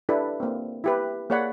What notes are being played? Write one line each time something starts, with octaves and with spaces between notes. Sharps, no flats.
D4 E4 G4 A4 B4
A#3 C4
E4 G4 B4
A#3 G#4 C#5 D5 F#5 B5